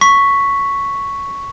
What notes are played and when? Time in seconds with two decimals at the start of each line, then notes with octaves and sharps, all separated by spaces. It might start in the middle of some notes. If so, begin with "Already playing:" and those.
0.01 C#6 B6